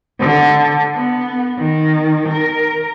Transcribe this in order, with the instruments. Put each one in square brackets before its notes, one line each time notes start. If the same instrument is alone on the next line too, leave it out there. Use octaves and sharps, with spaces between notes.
[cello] D3
B3
D#3
A#4